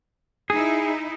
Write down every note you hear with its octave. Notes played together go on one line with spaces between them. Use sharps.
D#4 E4 G#4